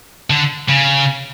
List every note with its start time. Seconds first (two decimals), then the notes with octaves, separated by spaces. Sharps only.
0.30 D3
0.69 C#3